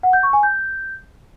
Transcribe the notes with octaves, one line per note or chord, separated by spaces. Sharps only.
F#5
G6
C#6
G#5
G6